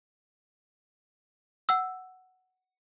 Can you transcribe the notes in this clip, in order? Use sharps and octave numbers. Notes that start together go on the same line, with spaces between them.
F#5 E6